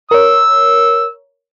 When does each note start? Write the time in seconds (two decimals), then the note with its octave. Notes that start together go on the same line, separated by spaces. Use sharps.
0.11 A#4 C#5 E6